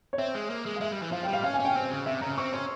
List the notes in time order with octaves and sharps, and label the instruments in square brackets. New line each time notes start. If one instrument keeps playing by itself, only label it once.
[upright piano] C#5
[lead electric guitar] C4 [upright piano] E5
[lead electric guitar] G#3
A#3
G#3
[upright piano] F5
[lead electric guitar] G#3 [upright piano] E5
[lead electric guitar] G3
E3
[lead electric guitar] F3 [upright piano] F5
[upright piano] G5
[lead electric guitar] G3
[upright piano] F5
[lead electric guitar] C#4 [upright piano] F5
[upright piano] G#5
[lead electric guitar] C#4
[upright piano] G5
[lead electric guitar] C4
C#3
[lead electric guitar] C3 [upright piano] E5
[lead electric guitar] C#3 [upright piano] A#5
[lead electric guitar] C4 [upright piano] C#6
[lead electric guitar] C#4 [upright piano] C6